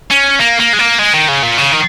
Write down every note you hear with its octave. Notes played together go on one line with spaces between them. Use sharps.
C#4
A#3
A#3
G#3
A#3
G#3
D#3
C#3
A#2
C#3
D#3